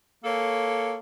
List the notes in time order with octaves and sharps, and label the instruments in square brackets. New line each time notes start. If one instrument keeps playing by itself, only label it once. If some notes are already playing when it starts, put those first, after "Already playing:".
[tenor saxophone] A#3 [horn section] A4 C#5